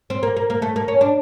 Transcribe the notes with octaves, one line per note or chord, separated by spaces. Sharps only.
C4
A#3
A#3
A#3
A3
A#3
C#4
D4